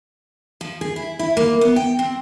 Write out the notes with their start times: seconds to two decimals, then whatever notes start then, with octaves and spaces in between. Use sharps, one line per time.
0.61 F3
0.81 G#4
0.96 E4
1.19 E4
1.37 A#3
1.61 B3
1.76 G5
1.99 C4